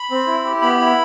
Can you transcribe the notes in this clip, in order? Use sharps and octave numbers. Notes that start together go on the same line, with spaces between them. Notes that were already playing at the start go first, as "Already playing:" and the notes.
Already playing: B5
C4
E4
G4
B3 B5
E4